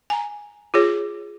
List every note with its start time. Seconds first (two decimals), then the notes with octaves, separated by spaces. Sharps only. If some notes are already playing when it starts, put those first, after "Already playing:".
0.10 G#5 A#5
0.74 F4 G#4 C#5